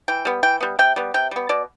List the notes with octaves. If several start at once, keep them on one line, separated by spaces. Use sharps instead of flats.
E3 G5
G3 B3
E3 G5
G3 B3
C3 G5
G3 B3
C3 G5
G3 B3
B2 D5